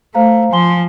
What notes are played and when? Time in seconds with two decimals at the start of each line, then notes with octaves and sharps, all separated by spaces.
0.15 A3 C5 F5 A#5
0.52 F3 G#5 C6 G7